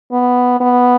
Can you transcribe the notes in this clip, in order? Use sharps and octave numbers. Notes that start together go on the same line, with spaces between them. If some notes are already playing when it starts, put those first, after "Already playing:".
B3
B3